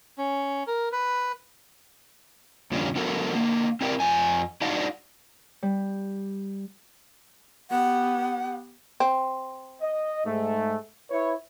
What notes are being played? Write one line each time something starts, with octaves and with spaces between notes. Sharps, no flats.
C#4
A#4
B4
F2 A#2 D3 G3 C#4
D3 F#3 B3 F#4 A4 A#4
D3 A#3
C4 E4 G4 A#4 C#5 D5
F2 G#5
D4 D#4 F#4 D5 F5
G3
B3 G4 F#5
C4
D#5
G#2 A3
E4 B4 C#5